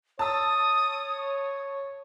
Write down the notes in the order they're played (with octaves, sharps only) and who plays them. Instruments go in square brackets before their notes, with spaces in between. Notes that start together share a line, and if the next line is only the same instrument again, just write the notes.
[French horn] C#5 [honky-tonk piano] A5 E6 [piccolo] D#6